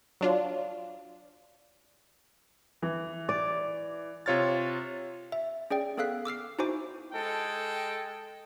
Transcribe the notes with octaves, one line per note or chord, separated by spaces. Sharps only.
F#3 D4 F4
E3
D5
C3 F4 C#5 F6 A6
E5
C#4 G#4 D5 G5
B3 G#4 A4 F5 F#6 B6
D6 E6 F6 C7
D#4 E4 F#4 C5 G#5 D6
G#3 A4 G5